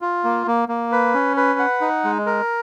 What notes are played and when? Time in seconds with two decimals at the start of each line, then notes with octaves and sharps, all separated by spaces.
0.01 F4
0.24 A#3
0.47 A#3
0.69 A#3
0.92 B4
1.14 C#4
1.37 B4
1.59 F#5
1.81 D#4
2.04 G#3
2.26 A#4